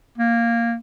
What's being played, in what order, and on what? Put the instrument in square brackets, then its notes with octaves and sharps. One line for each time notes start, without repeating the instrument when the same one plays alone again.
[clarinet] A#3